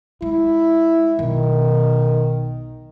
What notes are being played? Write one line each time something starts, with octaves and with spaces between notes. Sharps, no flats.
G#3 E4
B1 B2 D#3